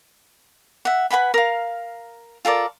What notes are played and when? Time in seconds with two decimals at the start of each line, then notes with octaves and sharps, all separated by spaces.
0.85 E5 F#5
1.10 B4 F#5 G#5 B5
1.34 A#4 F5
2.45 F4 A4 A#4 D5